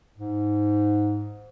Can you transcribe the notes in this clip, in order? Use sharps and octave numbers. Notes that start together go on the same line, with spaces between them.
G#2